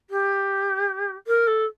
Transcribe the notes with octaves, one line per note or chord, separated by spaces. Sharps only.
G4
A#4
A4